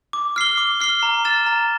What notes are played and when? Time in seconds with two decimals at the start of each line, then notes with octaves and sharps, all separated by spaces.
0.13 D6
0.36 F6 C7 G7
0.58 D6
0.80 F6 C7 G7
1.03 A#5
1.25 F6 A6 E7
1.46 A#5